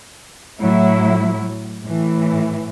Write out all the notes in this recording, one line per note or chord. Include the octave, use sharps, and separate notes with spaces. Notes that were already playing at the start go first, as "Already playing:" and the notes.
A2 F#3 E4
A2 E3